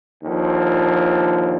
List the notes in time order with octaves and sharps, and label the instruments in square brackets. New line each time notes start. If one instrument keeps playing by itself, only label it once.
[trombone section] D#2 D3 F3